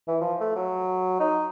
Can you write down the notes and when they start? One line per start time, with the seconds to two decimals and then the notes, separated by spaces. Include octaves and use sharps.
0.07 E3
0.21 F3
0.40 A3
0.56 F#3
1.19 D#4